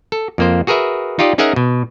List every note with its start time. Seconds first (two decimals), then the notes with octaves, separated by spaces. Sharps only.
0.12 A4
0.38 F2 A#3 C5
0.67 F#4 G#4 A#4 B4 E5
1.19 D#4 F4 G4 D5 D#5
1.38 C#4 D#4 G#4 A#4 E5 F#5
1.56 B2